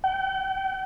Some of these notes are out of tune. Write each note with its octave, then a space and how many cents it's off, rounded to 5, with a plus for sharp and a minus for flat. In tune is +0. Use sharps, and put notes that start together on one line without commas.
G5 -40